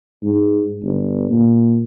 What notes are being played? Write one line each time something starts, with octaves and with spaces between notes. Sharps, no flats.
G#2
G1
A#2